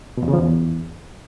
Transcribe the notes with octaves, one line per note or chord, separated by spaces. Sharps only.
B2
E2
C#3
F3
E2